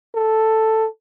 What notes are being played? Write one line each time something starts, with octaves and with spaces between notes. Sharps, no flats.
A4